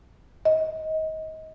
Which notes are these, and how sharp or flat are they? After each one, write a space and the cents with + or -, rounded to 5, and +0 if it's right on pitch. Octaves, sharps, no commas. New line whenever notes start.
D#5 +25